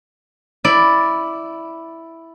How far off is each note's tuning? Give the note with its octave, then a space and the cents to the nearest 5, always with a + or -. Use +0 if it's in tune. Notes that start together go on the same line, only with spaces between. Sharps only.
E4 +0 D5 +0